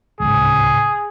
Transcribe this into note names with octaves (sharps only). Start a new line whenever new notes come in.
D1 G#1 C#2 G#4